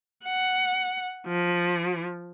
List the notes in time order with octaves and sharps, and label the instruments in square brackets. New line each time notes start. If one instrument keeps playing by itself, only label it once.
[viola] F#5
F3